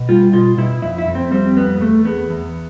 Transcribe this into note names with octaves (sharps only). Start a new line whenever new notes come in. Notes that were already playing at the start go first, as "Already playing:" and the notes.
Already playing: B2
G3 F4
B2 F4
B2 E4
F2 E4
E4
F2
C4
G3 C4
F2 B3
E2 A3
E2 B3
E2